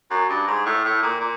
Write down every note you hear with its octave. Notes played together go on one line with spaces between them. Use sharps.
F#2
G2
G#2
A2
A2
A#2
A#2